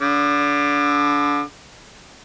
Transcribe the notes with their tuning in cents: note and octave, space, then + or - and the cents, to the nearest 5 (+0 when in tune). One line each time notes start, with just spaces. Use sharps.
D3 -30 D6 +25